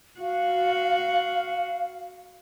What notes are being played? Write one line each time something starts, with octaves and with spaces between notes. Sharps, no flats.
F#4 F5